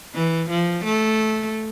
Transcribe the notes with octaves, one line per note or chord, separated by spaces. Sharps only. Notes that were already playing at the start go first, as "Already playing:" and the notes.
E3
F3
A3